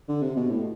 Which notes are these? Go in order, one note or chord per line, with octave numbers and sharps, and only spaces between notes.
D3
C3
B2
A2